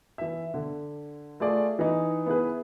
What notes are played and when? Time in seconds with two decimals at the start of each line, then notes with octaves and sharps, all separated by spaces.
0.18 E3 E5
0.54 D3
1.40 A3 F4 G#4 D5
1.79 E3 D#4
2.26 B3 E4 G#4 B4